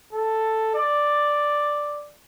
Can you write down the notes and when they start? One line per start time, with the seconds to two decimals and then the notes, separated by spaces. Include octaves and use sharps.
0.13 A4
0.75 D5